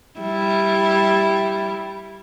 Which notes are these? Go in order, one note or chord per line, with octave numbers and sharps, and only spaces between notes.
G3 E4